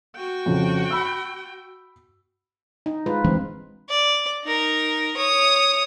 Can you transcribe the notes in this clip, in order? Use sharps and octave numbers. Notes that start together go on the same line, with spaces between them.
F#4 G5
F2 C#3
B5 E6
D#4
G#3 F4 B4
E3 G#3 C4 D4
D5
D#4 A#4
C#5 D#6